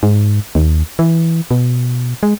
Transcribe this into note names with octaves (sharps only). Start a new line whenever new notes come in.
G#2
D#2
E3
B2
G#3